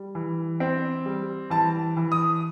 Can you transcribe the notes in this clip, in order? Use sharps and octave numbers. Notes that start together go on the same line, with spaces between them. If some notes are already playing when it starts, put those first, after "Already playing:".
Already playing: G3
E3
C4
G3
E3 A5
E3
D#6